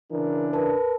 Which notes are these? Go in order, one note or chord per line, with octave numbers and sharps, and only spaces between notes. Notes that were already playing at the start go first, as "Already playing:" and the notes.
C#3 E3 D4 A#4
A#4 B4 A5